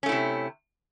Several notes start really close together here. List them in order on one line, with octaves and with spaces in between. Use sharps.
C#4 A3 E4 C3